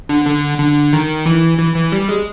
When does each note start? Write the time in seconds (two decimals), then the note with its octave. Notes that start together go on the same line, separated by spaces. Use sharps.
0.09 D3
0.26 D3
0.59 D3
0.93 D#3
1.26 E3
1.59 E3
1.76 E3
1.92 G3
2.09 G#3